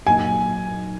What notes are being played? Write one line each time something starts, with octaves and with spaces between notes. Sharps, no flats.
A#2 F#3 A#3 D#4 G#5